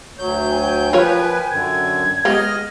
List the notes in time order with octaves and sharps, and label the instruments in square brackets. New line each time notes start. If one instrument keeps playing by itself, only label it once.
[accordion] D2 F#3 G6 [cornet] C#5
[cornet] G5 [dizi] G#5
[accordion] F3 B4 [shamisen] F4 A#4 C#5
[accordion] F#2 D3 [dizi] G#6
[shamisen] G#3 B3 G4 [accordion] D#5 F6